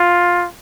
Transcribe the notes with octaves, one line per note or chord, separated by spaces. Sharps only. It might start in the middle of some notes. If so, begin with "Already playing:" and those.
Already playing: F4